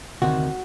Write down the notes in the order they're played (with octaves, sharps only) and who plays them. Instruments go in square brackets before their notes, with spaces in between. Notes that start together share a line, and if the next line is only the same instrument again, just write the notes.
[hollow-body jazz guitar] D2 C3 D#3 F#4